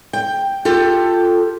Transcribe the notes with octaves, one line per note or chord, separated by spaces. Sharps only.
G5
F4 G4 A4